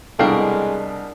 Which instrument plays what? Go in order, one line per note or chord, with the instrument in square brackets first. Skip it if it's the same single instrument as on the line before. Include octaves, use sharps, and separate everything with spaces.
[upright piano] C2 A4 [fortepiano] B2 F5 G5 [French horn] G#3 [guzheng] D4 A#4